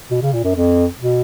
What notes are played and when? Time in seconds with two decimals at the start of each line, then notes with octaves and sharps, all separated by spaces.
0.11 B2
0.22 C#3
0.33 A#2
0.44 F#2
0.55 F2
0.99 B2